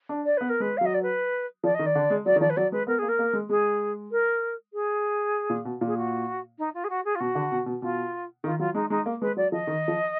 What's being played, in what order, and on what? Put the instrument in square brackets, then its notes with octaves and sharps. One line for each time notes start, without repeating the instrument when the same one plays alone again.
[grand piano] D4
[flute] D5
[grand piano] B3 [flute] B4
[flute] A#4
[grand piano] G#3 [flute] B4
[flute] F5
[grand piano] F#3 [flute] D#5
[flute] D5
B4
[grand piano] F3 [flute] D5
[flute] D#5
[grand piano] D#3
[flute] D5
[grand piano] D3
G#3
[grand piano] F#3 [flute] D5
[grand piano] D#3
[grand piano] F3 [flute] D5
[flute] B4
[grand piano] F#3 [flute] D5
[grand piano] G#3 [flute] B4
[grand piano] B3 [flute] A#4
[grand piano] A#3 [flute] G#4
[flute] A#4
[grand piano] A#3
G#3
[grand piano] G#3 [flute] G#4
[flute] A#4
G#4
[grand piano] A#2
B2
A#2
[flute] G#4
F#4
D#4
F4
G#4
F#4
G#4
F4
[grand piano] B2 [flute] F#4
[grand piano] D3
B2
B2
[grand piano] B2 [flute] F4
[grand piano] D#3 [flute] F4
[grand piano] F#3 [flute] F4
[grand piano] G#3 [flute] D#4
[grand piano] G#3 [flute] D#4
[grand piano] A#3
[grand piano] G#3 [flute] B4
[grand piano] F#3 [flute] D5
[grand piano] F3 [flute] D#5
[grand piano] D#3
F3